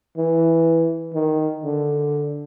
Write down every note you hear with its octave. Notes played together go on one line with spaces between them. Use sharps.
E3
D#3
D3